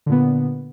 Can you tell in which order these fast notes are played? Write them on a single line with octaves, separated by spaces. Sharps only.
D3 A#2 B3